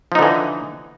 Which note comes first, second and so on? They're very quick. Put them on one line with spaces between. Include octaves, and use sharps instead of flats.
F3 D#4 D3 E3